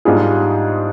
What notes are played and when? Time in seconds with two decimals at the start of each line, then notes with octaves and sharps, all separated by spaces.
0.05 G#2 G3 D4 F4 G#4